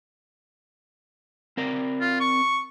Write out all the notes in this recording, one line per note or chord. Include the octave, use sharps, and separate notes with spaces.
C4 A#4 D5
F4
C#6